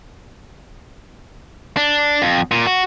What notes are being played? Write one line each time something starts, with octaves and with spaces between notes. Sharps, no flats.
D4
F2
A#2
F#4